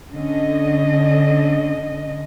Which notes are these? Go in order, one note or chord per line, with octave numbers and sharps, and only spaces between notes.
D3 C#4 D#5